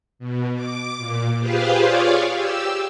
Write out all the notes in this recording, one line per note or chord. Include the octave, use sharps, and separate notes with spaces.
B2
D6
A#2
F4 G4 G#4 B4 C5 F5
F4 G#4 C#5 D5 F5
G4 E6